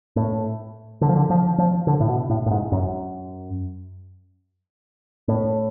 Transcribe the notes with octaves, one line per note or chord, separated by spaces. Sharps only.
A2
D3
F3
D3
F3
F3
D3
A2
B2
A2
A2
G#2
F#2
A2